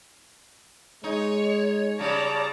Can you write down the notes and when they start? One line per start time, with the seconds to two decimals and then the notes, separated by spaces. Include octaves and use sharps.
1.04 G#3 D#4 C#5
1.99 C#3 G3 D5 A5 A#5